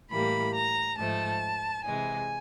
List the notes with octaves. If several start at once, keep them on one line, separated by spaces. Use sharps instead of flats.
A2 E3 G3 A#3 B5
A#5
G#2 F3 A3 A5
C3 E3 G#3 G#5